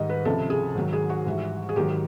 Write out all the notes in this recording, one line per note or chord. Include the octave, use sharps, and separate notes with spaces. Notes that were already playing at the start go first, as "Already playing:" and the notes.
Already playing: G#2 D#3 G3 D#5
B4
C#2 C3 F3 A4
G#4
G#2 D#3 F#3
G#4
F#4
G#2 E3 G3
G#4
G#2 D#3 F#3 G4